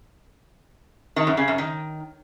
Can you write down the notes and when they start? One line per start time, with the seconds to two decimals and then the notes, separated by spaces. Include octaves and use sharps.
1.16 D#3
1.27 F#2
1.37 C#3
1.48 F#2
1.58 D#3